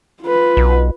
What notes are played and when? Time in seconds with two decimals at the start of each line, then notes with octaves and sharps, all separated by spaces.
0.23 F4 B4
0.57 B1